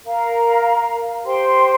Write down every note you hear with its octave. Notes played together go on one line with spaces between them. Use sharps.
A#4 F5 A#5
G4 C5 G5 C6